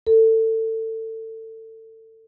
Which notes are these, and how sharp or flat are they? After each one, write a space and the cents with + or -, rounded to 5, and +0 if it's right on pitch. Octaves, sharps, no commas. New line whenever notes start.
A4 +25